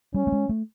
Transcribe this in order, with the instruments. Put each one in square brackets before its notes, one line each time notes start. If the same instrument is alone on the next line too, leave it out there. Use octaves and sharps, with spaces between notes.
[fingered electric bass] G3 [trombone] C#4
[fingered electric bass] A3
G#3
A3